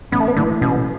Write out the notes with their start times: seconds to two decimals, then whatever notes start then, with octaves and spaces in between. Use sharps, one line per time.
0.12 A1 B3
0.20 A3
0.28 B3
0.36 A2 D3 E3
0.61 A1 B2